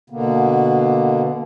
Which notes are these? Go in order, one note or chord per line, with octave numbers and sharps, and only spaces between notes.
B2 D3 A#3 B3